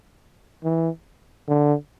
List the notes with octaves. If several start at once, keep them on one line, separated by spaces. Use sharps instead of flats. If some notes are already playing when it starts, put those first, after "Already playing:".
E3
D3